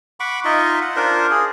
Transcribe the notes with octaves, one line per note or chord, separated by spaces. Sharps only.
F#5 B5 C#6 D6
D#4 F4 D#5 E5
F#5
D4 F4 A#4 C5
G#4